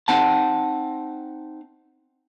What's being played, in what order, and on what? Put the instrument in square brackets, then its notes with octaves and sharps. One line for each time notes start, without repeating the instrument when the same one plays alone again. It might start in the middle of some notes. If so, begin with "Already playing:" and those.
[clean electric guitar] C4 D#4 F#5 A5